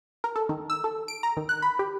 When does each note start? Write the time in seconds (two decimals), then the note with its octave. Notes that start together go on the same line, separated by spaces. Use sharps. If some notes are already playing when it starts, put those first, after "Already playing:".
0.24 A#4
0.36 A4
0.49 D#3
0.70 E6
0.84 A4
1.08 D7
1.23 A#5
1.37 D#3
1.49 F#6
1.62 B5
1.79 G4